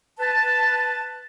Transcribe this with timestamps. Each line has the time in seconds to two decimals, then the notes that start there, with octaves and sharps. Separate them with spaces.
0.20 B4 A5